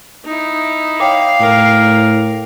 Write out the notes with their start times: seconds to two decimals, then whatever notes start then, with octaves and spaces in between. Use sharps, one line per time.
0.25 D#4 E4
1.00 C#5 F5 G5 D6
1.40 A2 A#4